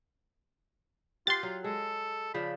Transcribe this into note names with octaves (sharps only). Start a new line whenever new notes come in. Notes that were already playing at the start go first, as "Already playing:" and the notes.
F4 G4 F#5 C6 A6
F#3
G#3 A4
C#3 F3 D4 B5